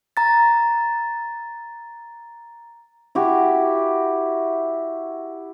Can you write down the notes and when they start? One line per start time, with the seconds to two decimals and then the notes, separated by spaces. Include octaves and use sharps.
0.17 A#5 A6
3.15 E4 F#4 G4